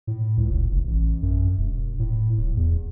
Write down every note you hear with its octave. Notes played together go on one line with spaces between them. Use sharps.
A2
C#2
F1
F#1
A1
F#2
E1
A2
D1
E2